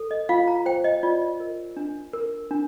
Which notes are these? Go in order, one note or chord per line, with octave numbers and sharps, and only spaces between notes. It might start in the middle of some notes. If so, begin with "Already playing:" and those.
Already playing: A4
D#5
F4 F5
A#5
C5 G5
D#5
F4 D5
D#5
A#4
D4
A#4
D4